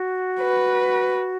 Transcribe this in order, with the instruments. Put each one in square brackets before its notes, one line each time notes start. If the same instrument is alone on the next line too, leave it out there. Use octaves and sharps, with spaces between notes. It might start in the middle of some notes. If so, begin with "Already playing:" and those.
Already playing: [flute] F#4
[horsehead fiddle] B4